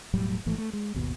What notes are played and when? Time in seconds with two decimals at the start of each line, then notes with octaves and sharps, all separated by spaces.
0.13 E1 A2 F#3 G3
0.46 G#1 G#2 E3 A3
0.58 A3
0.73 G#3
0.94 G#1 D#2 B2